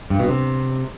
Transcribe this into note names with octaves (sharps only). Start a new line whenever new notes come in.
G2
B2
C3